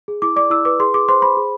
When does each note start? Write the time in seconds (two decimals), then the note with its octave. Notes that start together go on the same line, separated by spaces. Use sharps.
0.08 G#4
0.22 E4 D6
0.36 D5 D6
0.50 E4 E6
0.65 B4 D6
0.80 G#4 C6
0.94 G#4 D6
1.08 C5 C6
1.22 C5 B5
1.37 G#4